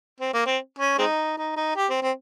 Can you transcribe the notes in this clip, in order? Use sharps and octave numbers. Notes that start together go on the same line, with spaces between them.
C4
A#3
C4
C#4
G#3 C4 D#4
D#4
D#4
G4
C4
C4